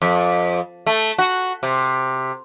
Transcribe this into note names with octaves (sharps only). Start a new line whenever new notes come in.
F2
A3
F#4
C3